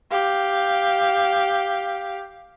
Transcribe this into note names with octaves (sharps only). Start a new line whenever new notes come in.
G4 F5